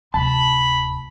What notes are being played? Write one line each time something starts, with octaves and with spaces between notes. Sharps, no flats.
D1 C3 A5 B5